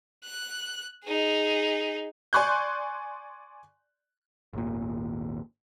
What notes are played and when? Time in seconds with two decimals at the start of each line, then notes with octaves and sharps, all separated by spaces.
0.24 F#6
1.04 D#4 G#4
2.33 D5 G#5 C6 C#6 F#6 G6
4.53 G#1 D#2 A#2